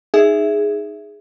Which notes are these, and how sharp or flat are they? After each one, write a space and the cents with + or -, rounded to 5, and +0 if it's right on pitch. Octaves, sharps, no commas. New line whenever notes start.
D#4 -5 G#4 +0 E5 +0